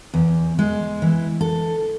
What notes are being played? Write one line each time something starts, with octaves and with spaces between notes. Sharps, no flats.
E2
G#3
E3
A4